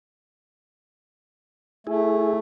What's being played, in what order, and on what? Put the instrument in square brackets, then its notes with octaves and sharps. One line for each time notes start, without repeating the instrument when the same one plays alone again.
[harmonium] A3 [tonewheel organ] E4 G#4